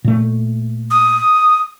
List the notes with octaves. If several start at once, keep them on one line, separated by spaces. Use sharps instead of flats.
A#2 A3
D#6